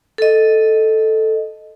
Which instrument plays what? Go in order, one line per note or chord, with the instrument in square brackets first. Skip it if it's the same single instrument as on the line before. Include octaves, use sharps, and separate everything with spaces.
[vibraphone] A4 D#5